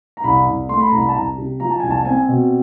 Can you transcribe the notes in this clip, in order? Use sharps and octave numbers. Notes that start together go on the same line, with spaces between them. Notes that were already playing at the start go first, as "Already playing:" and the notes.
A#5
C2 B5
C2
A3 C6
B5
C2 A#5
B5
A5
C2 A#5
C3
F3 A#5
A5
C2 G#5
A5
C4 G#5
B2